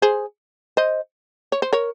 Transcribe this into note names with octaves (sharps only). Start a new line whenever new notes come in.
G#4 C5
C5 D#5
C#5
C5
A#4 C#5